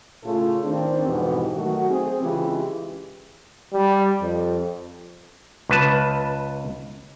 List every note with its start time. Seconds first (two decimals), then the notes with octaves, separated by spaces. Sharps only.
0.24 A2 C#3 A3 F4 G#4 A4
0.64 D#3 C4 D4
1.06 F2 G#2 B2 E3 B3 G4
1.55 D#3 F#3 A3 F#4
1.90 C4 G#4
2.22 C#3 E3 G#3 F4 G4
3.73 G3
4.22 F2
5.69 C#2 B4 A5